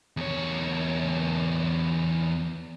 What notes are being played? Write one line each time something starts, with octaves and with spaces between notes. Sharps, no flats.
E2 C#5